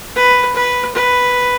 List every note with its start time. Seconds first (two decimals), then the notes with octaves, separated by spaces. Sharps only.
0.16 B4
0.56 B4
0.95 B4